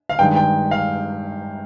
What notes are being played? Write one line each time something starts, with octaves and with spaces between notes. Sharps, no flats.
F5
G2 D#3 G#3 G5
G5
F5